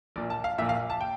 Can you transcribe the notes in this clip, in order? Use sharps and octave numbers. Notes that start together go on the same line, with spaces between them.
A#1 A#2 D5
A5
F5
A#1 A#2 E5
F5
A5
G5